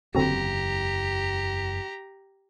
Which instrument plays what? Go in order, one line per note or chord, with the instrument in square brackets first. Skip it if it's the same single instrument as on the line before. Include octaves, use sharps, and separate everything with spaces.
[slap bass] F#1 E2 [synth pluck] D3 C4 F#4 [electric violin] G4 A#5